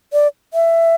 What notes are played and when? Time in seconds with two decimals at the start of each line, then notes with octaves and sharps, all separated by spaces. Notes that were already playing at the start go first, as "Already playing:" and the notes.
0.13 D5
0.54 E5